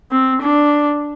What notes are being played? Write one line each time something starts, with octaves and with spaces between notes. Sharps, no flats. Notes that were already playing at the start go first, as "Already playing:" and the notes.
C4
D4